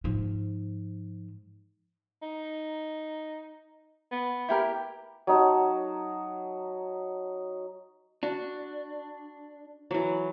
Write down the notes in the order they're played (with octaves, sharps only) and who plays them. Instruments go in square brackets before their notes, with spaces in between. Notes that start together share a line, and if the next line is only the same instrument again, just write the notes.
[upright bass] G#2 F3
[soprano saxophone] D#4
B3
[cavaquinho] E4 G4 A#4
[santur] F#3 D#4 A5
[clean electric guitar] D4 [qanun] F#4
[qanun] E3 F#3